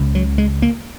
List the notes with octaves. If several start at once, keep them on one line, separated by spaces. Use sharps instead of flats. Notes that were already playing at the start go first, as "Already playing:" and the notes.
Already playing: C#2 C#3
F#3
G#3
A#3